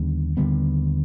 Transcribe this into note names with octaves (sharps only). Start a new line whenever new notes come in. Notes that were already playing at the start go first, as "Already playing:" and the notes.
Already playing: D#2 D3 G3 B3
D#2 D3 G3 B3